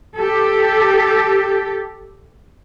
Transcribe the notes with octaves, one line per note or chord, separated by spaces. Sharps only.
G4 A4